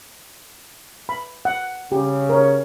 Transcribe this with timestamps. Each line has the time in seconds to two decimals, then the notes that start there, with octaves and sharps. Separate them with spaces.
1.09 B5
1.45 F#5
1.92 C#3 G4
2.29 A#4 C#5